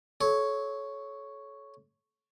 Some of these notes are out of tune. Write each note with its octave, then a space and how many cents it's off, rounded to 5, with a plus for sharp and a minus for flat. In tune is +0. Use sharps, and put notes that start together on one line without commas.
A4 -35 C#5 +0